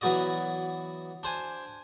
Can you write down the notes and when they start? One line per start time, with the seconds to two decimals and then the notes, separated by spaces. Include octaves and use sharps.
0.01 E3 F#3 B3 F#4 D5 D#5
1.23 D4 C5 G#5